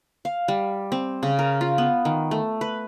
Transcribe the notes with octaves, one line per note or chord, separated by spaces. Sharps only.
F5
G3
C4
C#3
A#4
F4
B3
D#3
A3
B4